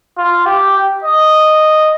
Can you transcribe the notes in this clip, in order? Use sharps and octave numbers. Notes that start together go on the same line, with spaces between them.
F4
G4
D#5